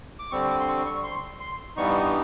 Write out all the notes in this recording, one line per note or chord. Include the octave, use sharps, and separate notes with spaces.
D6
D3 G3 C4 C#6
D6
C6
C#6
C#6
C6
C6
G2 E3 G3 B3 D#4 C#6